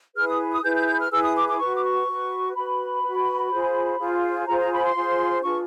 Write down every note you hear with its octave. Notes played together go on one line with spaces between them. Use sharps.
E4 G#4 B4 F6
D#6
D#6
E4 G#4 B4 G6
G6
G6
F6
E4 G#4 B4 E6
D#6
D6
D6
F#4 B4 C#6
D6
C#6
F#4 B4
F#4 B4 B5
F#4 B4
F4 G#4 C5
F4 G#4 C5
F4 G#4 C5 A#5
A#5
B5
C6
F4 G#4 C5
D4 F4 G#4 B4 C#6